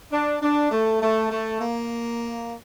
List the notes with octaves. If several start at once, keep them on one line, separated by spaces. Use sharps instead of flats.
D4
D4
A3
A3
A3
A#3